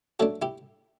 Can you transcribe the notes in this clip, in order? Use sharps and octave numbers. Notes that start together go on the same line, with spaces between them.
F#3 A3 D4 F#4 A4
E4 G4